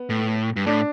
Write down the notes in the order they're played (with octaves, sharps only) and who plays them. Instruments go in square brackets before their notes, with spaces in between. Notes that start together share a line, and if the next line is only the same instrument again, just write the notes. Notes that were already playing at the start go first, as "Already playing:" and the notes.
Already playing: [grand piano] B3
[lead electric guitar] A2
G2
[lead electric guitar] A2 [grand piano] D4